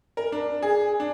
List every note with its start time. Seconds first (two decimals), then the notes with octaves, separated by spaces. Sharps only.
0.17 A#4
0.32 D4
0.62 G#4
1.00 D4